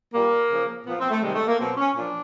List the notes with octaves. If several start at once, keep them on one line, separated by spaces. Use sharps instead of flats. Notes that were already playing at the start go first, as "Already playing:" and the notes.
A#2 G3 A#3
C#3 F3
A#2 F3 B3
C4
A3
C3 D#3 G3 G#3
A3
A#3
B2 F#3 C4
C#4
A#2 F3 D4